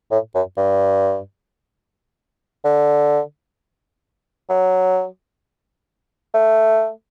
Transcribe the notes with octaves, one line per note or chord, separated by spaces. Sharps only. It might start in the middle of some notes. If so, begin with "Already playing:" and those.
A2
F#2
G2
D3
F#3
A3